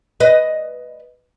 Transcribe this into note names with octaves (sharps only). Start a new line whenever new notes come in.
B4 D#5